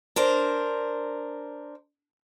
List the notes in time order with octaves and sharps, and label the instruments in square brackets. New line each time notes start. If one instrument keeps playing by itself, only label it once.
[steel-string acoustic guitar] D4 A#4 C5